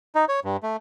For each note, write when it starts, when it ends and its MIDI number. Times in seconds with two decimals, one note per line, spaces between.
0.15 0.25 63
0.28 0.40 73
0.44 0.57 43
0.63 0.77 57